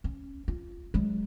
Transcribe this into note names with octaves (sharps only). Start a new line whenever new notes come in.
C#4
F4
F#3 G#3